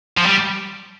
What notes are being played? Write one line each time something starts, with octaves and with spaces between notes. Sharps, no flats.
F3
G3